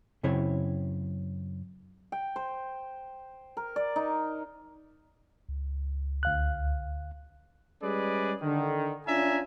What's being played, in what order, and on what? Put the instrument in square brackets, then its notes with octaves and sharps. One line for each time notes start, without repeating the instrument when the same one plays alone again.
[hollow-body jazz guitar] F#2 C#3 C4 E4 C#5
[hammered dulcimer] G5
C5
A#4
D5
D#4
[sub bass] C#2
[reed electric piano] D2 F5 F#6
[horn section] G3 G#3 C#4 G#4 B4 D5
D3 D#3
C#4 D4 F4 E5 G#5 A#5